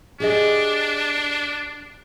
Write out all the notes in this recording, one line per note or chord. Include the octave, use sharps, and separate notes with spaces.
D4 G4 G#4 D#5